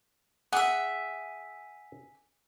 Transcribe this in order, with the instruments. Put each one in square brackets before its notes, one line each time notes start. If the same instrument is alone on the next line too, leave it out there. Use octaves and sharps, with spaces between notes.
[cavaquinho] G#4 E5 [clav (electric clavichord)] F#5